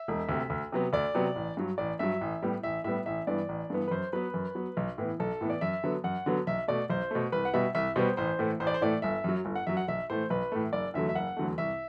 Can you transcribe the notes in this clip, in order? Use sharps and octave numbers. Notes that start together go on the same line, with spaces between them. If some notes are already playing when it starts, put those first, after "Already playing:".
Already playing: E5
E1
D2 C3
D2
C3 F#3 B3
D2 D5
C3 F#3 B3
A1
G2 F#3
A1 D5
G2 F#3 E5
A1
A2 G3 B3
A1 E5
A2 G3 B3 E5
A1 E5
G2 E3 B3 D5
A1
G2 E3 B3
B4
F#2 C5
F#3 B3 B4
F#2
F#3 B3
B1
A2 E3 B3
B1 A4
A2 E3 B3
D5
F#2 E5
D3 F#3 B3
F#2 F#5
D3 F#3 B3
B1 E5
B2 A3 D5
B1 C5
B2 A3
C2 B4
F#5
B2 G3 B3 E5
C2 E5
B2 G3 B3 C5
A1 C5
A2 E3 A3
A1 C5
D5
C5
A2 E3 A3 D5
G1 E5
F#2 F#3
G1
F#5
F#2 F#3 E5
F#5
B1 E5
A2 E3 A3 C5
B1 B4
A2 E3 A3
F#1 D5
E2 D3 F#3 A3 E5
E5
F#1 F#5
E2 D3 F#3 A3
C2 E5